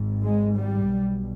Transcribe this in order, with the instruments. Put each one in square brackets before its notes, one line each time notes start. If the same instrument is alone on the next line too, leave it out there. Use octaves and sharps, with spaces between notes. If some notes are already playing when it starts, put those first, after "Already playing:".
Already playing: [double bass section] G#1 G#2
G#3
G3
B1 B2